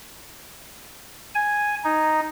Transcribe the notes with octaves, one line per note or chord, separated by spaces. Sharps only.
G#5
D#4